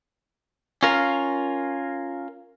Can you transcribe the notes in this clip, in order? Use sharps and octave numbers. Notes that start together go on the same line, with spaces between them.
C#4 F4 A#4 F5